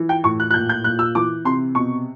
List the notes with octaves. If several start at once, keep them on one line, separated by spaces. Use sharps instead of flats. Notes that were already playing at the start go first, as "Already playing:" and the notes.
Already playing: E3
G5
A2 C#6
F#6
F#6
A#2 G6
G6
A#2 F#6
E6
E3 D6
C3 C6
B2 C#6